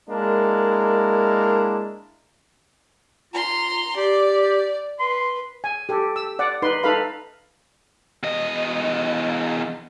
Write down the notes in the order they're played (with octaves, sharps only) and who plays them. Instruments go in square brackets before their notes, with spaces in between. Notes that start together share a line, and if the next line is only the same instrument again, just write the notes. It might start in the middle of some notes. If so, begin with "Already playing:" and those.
[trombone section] G#3 A#3 D4 E4 A#4
[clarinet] F4 [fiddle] A#5 C6
[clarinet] G4 [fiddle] D5
[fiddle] B4 [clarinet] C6
[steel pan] G#5
G4 A4
E6
D5 F#5
D#4 B4 C6
D#4 A4 B4 F5 B5
[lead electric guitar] E2 D#5